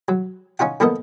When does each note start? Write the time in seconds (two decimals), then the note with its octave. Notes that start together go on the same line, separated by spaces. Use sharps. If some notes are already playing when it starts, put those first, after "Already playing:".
0.08 F#3
0.59 C#4 D#4 F4 F#5
0.80 D3 F3 A#3 B3 A4 D#5